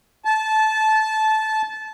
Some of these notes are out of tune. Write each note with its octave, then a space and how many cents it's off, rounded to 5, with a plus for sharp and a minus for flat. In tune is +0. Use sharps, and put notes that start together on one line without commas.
A5 -20